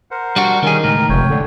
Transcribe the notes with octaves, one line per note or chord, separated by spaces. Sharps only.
A#4 C5 F#5
G3 D4 F#4
D#3 G3 C#4 G#4
C#2 A2 A#4
F1 C#5 G5
D3